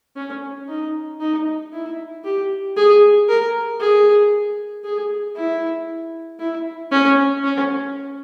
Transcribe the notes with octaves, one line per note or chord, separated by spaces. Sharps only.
C#4
D#4
D#4
E4
G4
G#4
A#4
G#4
G#4
E4
E4
C#4
C#4